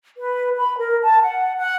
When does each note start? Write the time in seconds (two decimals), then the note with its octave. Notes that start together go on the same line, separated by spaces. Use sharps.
0.17 B4
0.56 B5
0.78 A#4
1.02 A5
1.22 F#5
1.57 F#5